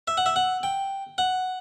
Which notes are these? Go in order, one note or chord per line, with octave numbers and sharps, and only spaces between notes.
E5
F#5
E5
F#5
G5
F#5